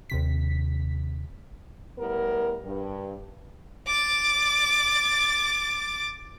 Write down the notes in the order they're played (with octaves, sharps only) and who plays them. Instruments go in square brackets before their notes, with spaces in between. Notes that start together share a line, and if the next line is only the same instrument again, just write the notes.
[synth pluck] D#2 C3 B6
[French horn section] A2 G3 B3 A#4
G2
[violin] D6 A6